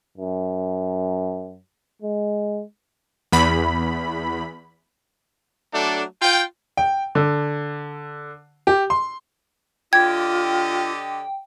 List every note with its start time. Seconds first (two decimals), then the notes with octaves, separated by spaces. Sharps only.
0.18 F#2
2.02 G#3
3.33 E2 B5
5.74 F#3 A3 D4 A4 D5
6.22 F4 G5
6.77 G5
7.15 D3
8.67 G4
8.90 C6
9.93 D3 F4 G4 D#5 G5 G#6